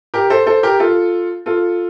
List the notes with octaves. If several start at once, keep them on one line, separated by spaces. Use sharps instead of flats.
G4 A#4
A4 C5
A4 C5
G4 A#4
F4 A4
F4 A4